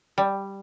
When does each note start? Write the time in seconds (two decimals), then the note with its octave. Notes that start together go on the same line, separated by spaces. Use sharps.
0.18 G3